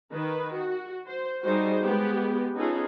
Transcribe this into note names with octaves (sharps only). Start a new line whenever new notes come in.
D#3 B4
F#4
C5
G3 D#4 F#4 G#4 C5
G#3 B3 G4
B3 C#4 D#4 F4 G#4 A4